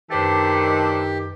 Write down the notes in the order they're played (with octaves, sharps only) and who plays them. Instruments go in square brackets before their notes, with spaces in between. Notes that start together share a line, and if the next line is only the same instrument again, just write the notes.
[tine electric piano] F#2 B4 A6 [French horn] D#3 [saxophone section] A3 D4 C5 [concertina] G4